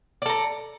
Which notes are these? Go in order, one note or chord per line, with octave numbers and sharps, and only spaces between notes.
A4 D5 A#5